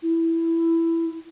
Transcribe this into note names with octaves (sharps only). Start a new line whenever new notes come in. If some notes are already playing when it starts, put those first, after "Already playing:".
E4